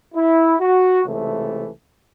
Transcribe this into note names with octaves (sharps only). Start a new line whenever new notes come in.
E4
F#4
C#2 C3 E3 A3